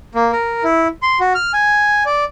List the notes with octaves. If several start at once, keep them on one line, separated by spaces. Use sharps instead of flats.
A#3
A#4
E4
C6
F#4
F6
G#5
D5